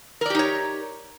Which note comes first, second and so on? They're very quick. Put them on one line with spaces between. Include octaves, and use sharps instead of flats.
A#4 D5 G4 D#4 C#5